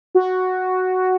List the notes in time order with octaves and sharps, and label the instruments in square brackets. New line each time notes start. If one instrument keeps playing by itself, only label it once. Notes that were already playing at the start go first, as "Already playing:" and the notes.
[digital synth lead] F#4